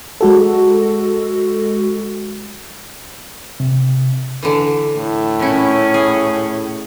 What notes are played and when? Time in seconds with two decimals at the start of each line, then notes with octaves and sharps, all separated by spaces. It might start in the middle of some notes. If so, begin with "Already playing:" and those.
0.21 G#3 F#4 A4
3.60 C3
4.43 D3 E3
4.97 A2
5.39 A#2 C#4 E4
5.94 G#4